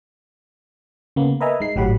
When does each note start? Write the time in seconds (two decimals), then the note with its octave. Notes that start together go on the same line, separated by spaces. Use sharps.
1.16 C#3 A#3 B3
1.41 A#4 B4 D#5 E5 G#5 A#5
1.60 G#3 D#4 C7
1.75 G#1 A2 F#3 G4 F#5 B5